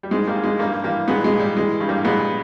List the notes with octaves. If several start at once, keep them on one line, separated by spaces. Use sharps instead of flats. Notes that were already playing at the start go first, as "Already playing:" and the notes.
G3
G#2 G#3
G3 A#3
G#2
G#3
G2 G3 A#3
E3 G3 A#3
A#2 G#3 B3
G#3
A#2
G3
E3 G#3
G2
G3 A#3
A#2 G#3 B3